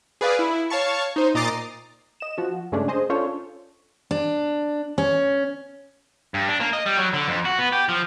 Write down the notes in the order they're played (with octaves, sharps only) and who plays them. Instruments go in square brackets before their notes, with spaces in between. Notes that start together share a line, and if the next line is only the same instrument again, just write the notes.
[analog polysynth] G#4 B4 D5 F5
E4
C#5 F5 A5 C#6
D#4 C5
A#2 D#5 A#5 D6 A6 C7
[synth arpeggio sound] D#5 E7
F3 F#4
G2 C#3 G#3 A3 C#4 D4
G#4 C5 D#5
C#4 D4 F4 A4 C5 C#5
[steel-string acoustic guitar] D4
C#4
[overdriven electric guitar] G2
D4
A#3
D#5
G3
F#3
D3
F2
F#4
B3
G4
F3